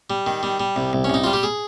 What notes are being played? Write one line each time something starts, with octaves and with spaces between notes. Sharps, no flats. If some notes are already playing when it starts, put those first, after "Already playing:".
G3
D#3
G3
G3
C2
C2
C#4
C2 D#4
G3 F4
G4
G#4